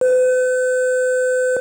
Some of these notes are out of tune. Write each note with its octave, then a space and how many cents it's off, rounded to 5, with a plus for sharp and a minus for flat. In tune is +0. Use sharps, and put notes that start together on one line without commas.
B4 +45